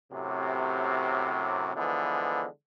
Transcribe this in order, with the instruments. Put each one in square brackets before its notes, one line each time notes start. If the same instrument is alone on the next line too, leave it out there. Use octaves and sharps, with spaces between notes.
[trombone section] F#2 A2 C3
D3 E3 F3 G#3 B3